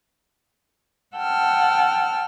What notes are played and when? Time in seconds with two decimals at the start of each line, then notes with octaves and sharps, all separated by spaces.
1.15 F#5 G5 A5 E6 F6